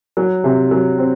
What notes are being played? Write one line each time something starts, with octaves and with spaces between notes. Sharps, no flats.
F#3
C3
F#3
C4